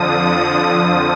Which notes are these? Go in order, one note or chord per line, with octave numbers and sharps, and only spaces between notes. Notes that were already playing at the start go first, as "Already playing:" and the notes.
Already playing: F2 D3 F3 D#6